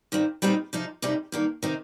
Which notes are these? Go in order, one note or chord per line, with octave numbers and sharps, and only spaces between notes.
G2 D#3 C4
A#2 G3 C4 D#4
C3 F3 D#4
F2 C3 G3 D#4
G2 D#3 A#3
C3 D#3 C4 D#4